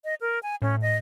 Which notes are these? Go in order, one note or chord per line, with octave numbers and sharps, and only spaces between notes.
D#5
A#4
G#5
A2 C#4
D#5